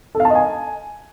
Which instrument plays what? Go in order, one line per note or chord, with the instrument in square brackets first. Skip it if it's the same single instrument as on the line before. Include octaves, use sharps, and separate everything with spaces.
[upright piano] A4
F5
A5
D#5
G#5